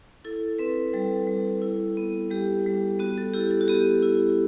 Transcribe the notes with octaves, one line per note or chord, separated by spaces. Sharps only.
E4 A4
C4 B4
G3 A4
G3
E4
B3
G3 G4
G3
B3 F#4
A4
E4 G4
A4
F#4
B3 G4
E4